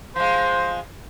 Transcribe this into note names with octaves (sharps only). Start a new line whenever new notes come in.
F3 G#3 C5